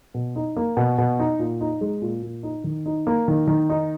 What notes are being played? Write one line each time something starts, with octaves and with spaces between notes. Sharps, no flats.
B2
D#4
A#3
B2
B2
D#4
A#2
D#4
G#3
A#2
A#2
D#4
D#3
D#4
A#3
D#3
D#3
D#4